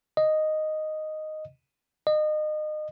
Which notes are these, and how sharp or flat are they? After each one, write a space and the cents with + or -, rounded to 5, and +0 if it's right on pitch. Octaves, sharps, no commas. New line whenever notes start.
D#5 -5
D#5 -30